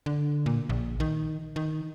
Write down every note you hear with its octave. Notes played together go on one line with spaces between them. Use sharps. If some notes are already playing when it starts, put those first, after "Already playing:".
D3
A#2
A#1
D#3
D#3